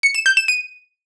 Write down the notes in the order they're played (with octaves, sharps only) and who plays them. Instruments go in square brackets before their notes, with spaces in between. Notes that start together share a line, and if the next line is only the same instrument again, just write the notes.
[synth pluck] C#7
E7
G6
E7
D#7